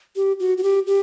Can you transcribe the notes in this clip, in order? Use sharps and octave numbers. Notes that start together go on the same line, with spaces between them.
G4
F#4
F#4
G4
G4